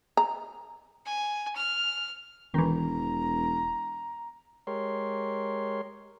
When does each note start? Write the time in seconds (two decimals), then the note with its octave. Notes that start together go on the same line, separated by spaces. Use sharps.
0.17 A#5
1.06 G#5
1.56 F6
2.54 E1 D#3 E3 A#5
4.67 G#3 G4 A#4 C#5 C6